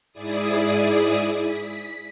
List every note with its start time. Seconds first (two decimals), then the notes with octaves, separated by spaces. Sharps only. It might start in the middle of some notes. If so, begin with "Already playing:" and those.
0.13 G#2 E4 G#4 D5 D#6
1.34 B6